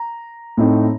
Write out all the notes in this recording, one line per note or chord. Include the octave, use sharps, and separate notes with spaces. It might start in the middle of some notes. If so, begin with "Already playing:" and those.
Already playing: A#5
A2 A3 C4 D#4